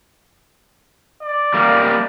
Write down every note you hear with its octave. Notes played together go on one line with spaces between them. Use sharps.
D5
G3 A#3